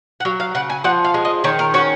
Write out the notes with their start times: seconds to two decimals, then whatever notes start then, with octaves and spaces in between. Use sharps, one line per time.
0.20 F#5
0.25 F#3 F5
0.40 F5
0.55 C#3 F#5
0.70 G#5
0.84 F3 F#5
1.04 F5
1.14 G#3
1.25 D#5
1.44 D#3 C#5
1.59 A#4
1.74 C#4 F#4